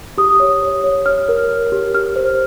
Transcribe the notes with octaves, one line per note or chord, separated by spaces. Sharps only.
G4 D#6
C#5
C#5
C#5
C#5 F6
A#4
A#4
G4
G4 F6
C5